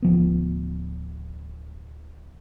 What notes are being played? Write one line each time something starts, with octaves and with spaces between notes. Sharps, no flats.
D1 F3 B3